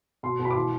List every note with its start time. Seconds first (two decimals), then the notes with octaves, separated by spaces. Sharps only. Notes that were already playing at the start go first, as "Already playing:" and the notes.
0.23 B2 C6
0.39 B2
0.45 B5
0.50 D6
0.55 E3 C6